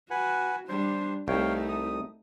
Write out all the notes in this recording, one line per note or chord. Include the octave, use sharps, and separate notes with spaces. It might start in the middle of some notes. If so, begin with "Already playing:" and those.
F#4 B4 F#5 G#5
G3 D4 C5
C2 A3 D#4 C#5 F5 G5
D#6